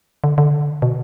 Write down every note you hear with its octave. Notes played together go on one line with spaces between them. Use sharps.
D3
D3
B2